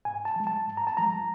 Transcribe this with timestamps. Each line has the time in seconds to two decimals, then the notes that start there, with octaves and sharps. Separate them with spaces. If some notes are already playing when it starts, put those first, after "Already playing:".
0.05 G#2 G#5
0.25 A5
0.36 F3 G#3
0.47 A5
0.67 G#2
0.77 A#5
0.87 A5
0.97 F3 G#3 A#5